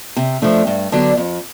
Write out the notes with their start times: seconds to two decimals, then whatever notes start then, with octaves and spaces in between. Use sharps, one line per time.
0.17 C3
0.42 F3 A3 D4
0.67 G2
0.92 D3 F#3 B3 D4
1.17 F2